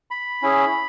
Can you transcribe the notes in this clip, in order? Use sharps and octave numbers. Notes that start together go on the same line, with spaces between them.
B5
C#4 E4 G#4